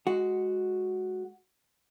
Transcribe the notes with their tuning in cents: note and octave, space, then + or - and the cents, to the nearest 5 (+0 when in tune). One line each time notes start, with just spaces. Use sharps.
G#3 +0 F#4 +0